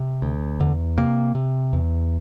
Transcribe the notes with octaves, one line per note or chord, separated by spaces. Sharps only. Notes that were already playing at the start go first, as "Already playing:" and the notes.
Already playing: C3
D2
E2 D3
C3 A#3
C3
E2